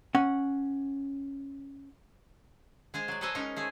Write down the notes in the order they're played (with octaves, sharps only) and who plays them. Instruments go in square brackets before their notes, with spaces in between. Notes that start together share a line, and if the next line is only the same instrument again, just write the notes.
[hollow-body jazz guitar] C#4 F#5
[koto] G#3 G#4 C5 F5
F#3 D5
G#4 A4 B4 C5 D#5 E5
G#3 C#4 D#4 A#4
A3 G#4 C5